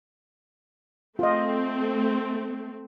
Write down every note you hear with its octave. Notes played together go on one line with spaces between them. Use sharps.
A3 C4 F4 D#5